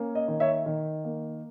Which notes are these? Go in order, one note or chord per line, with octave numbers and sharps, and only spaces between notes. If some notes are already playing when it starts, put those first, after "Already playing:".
Already playing: A#3 C#4
D#5
D#3
C#5 E5
D#3
A#3